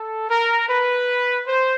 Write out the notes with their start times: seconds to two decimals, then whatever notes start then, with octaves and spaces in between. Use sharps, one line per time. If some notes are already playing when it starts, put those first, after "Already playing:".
Already playing: A4
0.30 A#4
0.69 B4
1.47 C5